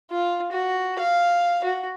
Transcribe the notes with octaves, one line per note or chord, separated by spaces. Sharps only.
F4
F#4
F5
F#4